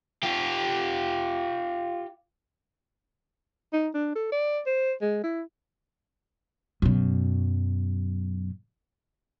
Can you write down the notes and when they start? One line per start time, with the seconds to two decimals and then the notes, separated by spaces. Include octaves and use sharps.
0.23 F4 G4
3.73 D#4
3.94 D4
4.15 A4
4.32 D5
4.66 C5
5.01 G#3
5.24 E4
6.82 F#2 B2